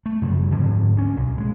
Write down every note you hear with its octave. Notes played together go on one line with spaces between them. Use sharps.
A3
F#2 C#3 F3 G3
G#2 D3 F3 C4
D2 C#4
B1
A#2 G3 G#3